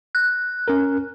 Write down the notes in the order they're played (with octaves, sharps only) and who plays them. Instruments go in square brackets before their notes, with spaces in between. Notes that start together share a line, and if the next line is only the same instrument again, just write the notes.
[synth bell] F#6
[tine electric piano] C#4 A#4